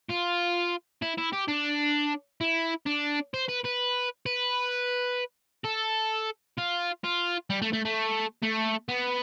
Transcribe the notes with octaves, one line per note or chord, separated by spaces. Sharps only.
F4
E4
E4
G4
D4
E4
D4
C5
B4
B4
B4
A4
F4
F4
G3
A3
A3
A3
A3
B3